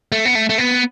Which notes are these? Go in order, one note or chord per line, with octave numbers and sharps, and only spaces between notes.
A3
B3
A3
A3
B3